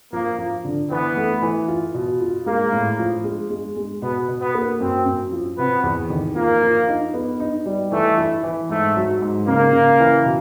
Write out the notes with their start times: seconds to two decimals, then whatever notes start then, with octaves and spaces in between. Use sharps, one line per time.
0.13 F3 A#3
0.39 F3
0.65 D3
0.90 E3 B3
1.17 A3
1.42 E3
1.68 F4
1.94 B2
2.21 F4
2.46 G#3 A#3
2.73 A2
2.99 F3
3.24 G#3
3.50 G#3
3.76 G#3
4.02 B2 B3
4.28 B2
4.41 B3
4.55 A#3
4.80 F#2 C4
5.06 F#2
5.32 F3
5.58 C3 B3
5.83 E2
6.10 D#3
6.36 F3 A#3
6.62 F3
6.88 D#4
7.14 B3
7.40 D#4
7.66 G3
7.91 E3 A3
8.18 E4
8.43 E3
8.69 G#2 A3
8.96 F#3
9.22 G#2
9.47 C#3 A#3
9.73 C#3
10.00 E3
10.25 B2